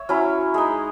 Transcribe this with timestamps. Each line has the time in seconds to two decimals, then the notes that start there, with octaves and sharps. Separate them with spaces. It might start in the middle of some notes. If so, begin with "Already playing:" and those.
Already playing: C#5 E5
0.09 F#3 C#4 E4
0.54 G#3 D#4